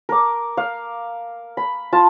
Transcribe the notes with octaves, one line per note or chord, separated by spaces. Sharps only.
A#4 D6
F5
B5
F4 A5